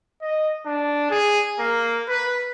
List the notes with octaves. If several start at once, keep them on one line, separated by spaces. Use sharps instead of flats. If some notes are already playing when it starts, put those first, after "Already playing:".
D#5
D4
G#4
A#3
B4